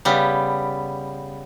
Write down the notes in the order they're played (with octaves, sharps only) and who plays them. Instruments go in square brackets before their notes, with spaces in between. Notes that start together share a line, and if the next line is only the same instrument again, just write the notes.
[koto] C#3 G3 B3